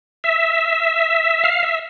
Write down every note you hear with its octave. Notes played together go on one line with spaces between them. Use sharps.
E5
F5
E5